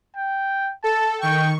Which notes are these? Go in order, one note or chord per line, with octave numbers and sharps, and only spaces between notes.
G5
A4 A5
D#3 G5 C#6